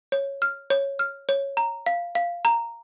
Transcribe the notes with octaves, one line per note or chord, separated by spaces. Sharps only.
C#5
F6
C#5
F6
C#5
A#5
F5
F5
A#5